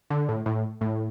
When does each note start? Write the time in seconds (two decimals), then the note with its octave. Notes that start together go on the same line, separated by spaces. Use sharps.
0.10 D3
0.29 A2
0.46 A2
0.81 A2